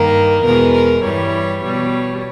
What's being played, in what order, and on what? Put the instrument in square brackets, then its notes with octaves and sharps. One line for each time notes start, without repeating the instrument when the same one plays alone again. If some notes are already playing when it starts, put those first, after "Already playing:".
Already playing: [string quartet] G2 D#3 A#3 A#4
E2 B2 G#3 B3 A#4
A#4
G2 E3 G3 C#5
B2 G3 B3 C#5